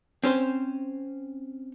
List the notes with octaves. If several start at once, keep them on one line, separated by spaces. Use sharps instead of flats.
C4 C#4 C5